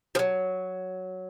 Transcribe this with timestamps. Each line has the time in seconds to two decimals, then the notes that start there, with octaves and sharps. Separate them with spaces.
0.15 F3
0.19 F#3